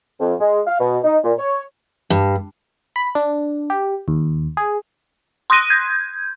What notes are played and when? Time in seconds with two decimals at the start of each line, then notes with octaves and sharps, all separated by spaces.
0.20 F2
0.40 G#3
0.67 F5
0.80 B2
1.04 D#4
1.23 A#2
1.38 C#5
2.10 G2
2.96 B5
3.15 D4
3.70 G4
4.08 D#2
4.57 G#4
5.50 C6 D#6 F#6 A#6 D#7
5.70 G6 G#6